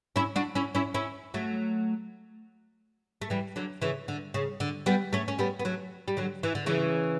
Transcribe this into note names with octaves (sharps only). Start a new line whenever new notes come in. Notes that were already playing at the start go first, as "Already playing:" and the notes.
C#4 E4
D4 F#4
C#4 E4
C#4 E4
C#4 E4
F#3 A3
A3
E3 G3
D3 F#3
C#3 E3
D3
C#3
D3
G3 B3
A3 C#4
C#4
G3 B3
B3
F#3 A3
G3
D3 F#3
E3
D3
C#3 E3